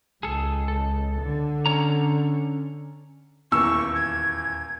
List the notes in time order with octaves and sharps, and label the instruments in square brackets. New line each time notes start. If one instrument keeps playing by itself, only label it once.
[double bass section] C#2 [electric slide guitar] G#4 A4
[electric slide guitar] A4
[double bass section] D3
[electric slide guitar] C#4 C#5 A#5
[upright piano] D#1 E2 E6 [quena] C#6
[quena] G#6